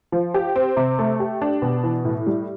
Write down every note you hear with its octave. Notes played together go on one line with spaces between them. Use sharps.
F3
G4
C4
C3
A3
G4
D4
B2
E3
A2
G3